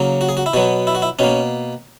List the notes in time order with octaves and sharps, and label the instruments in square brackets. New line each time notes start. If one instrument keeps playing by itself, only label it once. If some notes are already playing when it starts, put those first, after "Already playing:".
Already playing: [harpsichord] C#3 F#3 A#3
F#4
G#4
F#4
E4
B2 F#3 B3 F#4
E4
F#4
E4
B2 A#3 C#4